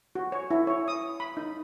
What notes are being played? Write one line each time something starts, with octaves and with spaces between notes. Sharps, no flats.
F#4
C#5
E4
C#5
D#6
B5
D#4